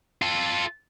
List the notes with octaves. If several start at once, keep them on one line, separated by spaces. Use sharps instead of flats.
F4 A4